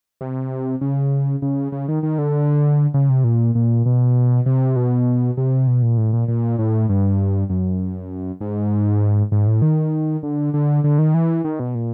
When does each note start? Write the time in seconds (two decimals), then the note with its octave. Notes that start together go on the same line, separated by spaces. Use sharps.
0.21 C3
0.81 C#3
1.42 C#3
1.72 C#3
1.88 D#3
2.03 D#3
2.18 D3
2.94 C#3
3.09 C3
3.24 A#2
3.55 A#2
3.86 B2
4.46 C3
4.76 B2
5.37 C3
5.67 B2
5.82 A#2
5.97 A2
6.13 A#2
6.28 A#2
6.59 A2
6.89 G2
7.50 F#2
8.41 G#2
9.32 G#2
9.47 A2
9.62 D#3
10.23 D3
10.54 D3
10.84 D3
10.99 D#3
11.14 E3
11.44 D#3
11.60 B2
11.75 A#2